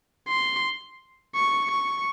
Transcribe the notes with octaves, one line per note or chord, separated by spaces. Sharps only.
C6
C#6
C#6